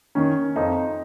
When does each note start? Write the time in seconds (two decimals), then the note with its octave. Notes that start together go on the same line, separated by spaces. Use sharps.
0.15 D#3 C#4
0.56 F2 D#4